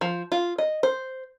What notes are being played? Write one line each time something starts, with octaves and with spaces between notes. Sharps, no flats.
F3
F4
D#5
C5